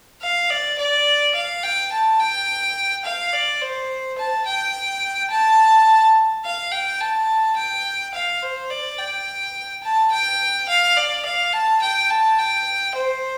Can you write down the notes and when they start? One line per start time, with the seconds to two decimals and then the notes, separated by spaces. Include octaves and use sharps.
0.22 F5
0.50 D5
0.78 D5
1.35 F5
1.63 G5
1.92 A5
2.20 G5
3.05 F5
3.33 D5
3.61 C5
4.18 A5
4.46 G5
5.31 A5
6.45 F5
6.72 G5
7.01 A5
7.57 G5
8.14 F5
8.43 C5
8.70 D5
8.99 G5
9.84 A5
10.12 G5
10.69 F5
10.97 D5
11.25 F5
11.53 A5
11.82 G5
12.10 A5
12.39 G5
12.95 C5